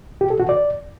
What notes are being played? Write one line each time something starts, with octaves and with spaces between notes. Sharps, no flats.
G4
A4
F#4
D5